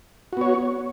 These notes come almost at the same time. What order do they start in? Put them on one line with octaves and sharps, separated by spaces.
F#4 B3 C#5